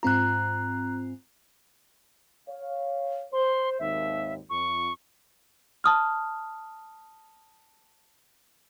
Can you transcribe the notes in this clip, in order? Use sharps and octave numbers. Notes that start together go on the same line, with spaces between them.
G#2 C4 F4 A#5 F#6
C#5 F5
C5 C6
G#1 D#2 E5
F2 C#6
A5 D#6 F6